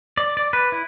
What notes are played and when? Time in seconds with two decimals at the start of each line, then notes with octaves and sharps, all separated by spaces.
0.17 D5
0.37 D5
0.53 B4
0.72 E4